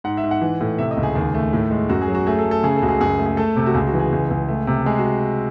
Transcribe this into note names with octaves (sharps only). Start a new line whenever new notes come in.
G#2 F#5
E5
G#2
F#5
E3
A2
C3 E5
D#5
C#2
G#4
D#2
A3
A2
G#3
F#2 F#4
G#4
F#3
F#4
A3 G#4
A4
A3
A4
C#3 G#4
A4
C#2 F#4
G#4
F#2 G#4
A3
G#4
A3 A4
C3
F#4
C#2 G#4
F#4
E3
G#4
C#2
C#2
A3
C3
G#3 G#4
F#4